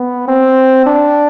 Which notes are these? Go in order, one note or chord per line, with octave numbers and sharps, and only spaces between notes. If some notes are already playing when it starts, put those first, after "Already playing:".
Already playing: B3
C4
D4